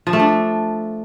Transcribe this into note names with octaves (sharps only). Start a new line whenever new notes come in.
F3
A3
D4